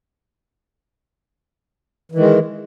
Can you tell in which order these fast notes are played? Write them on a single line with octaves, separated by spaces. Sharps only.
E3 D#3 G#3